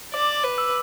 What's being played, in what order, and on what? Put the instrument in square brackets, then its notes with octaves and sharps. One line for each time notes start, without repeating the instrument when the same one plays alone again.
[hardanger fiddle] D5 [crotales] D6
[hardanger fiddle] B4
[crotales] E6